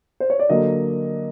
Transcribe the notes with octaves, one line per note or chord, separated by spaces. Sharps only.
C5
C#5
D5
D3 F#3 A#3 D#5